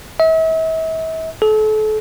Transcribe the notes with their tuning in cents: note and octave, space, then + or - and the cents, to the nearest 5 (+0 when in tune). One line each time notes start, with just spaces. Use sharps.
E5 -40
A4 -35